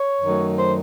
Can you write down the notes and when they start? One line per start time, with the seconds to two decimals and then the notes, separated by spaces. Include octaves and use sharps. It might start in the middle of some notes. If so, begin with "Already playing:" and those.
Already playing: C#5
0.22 F#2 D#3 F#3 A3
0.57 C5